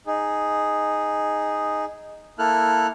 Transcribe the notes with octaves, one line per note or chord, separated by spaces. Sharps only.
D#4 G#4
A#3 E4 A4 F6 F#6